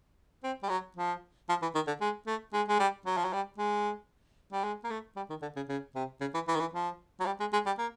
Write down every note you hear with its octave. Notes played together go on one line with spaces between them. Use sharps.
C4
G3
F#3
F3
F3
E3
D#3
D3
G#3
A3
G#3
G#3
G3
F#3
F3
F#3
G3
G#3
G3
G#3
A#3
A3
G3
D#3
D3
C#3
C#3
C3
C#3
E3
E3
D#3
E3
F3
F#3
G3
G#3
G#3
G3
A#3